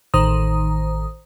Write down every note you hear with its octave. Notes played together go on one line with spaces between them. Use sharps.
A1 D#3 C5 A#5 D#6